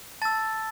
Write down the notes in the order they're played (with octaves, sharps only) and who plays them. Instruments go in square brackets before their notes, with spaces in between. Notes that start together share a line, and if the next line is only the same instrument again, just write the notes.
[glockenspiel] A5 E6 A6